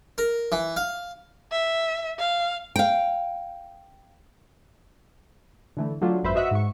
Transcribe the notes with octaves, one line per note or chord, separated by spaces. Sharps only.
A#4
E3
F5
E5
F5
F5 G5
D3 E3 A3
F#3 A3 D4 F4
G#1 F#2 B4 C5 E5
F#4 D#5 E5 F#5
G#2 C#6